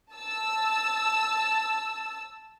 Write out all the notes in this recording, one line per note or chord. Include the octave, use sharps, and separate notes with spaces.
A5 E6